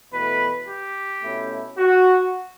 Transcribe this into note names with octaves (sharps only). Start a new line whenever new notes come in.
E2 B2 A3 B4
G4
B2 A3 C#4 E4
F#4